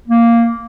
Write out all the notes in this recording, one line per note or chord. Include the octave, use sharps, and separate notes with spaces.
A#3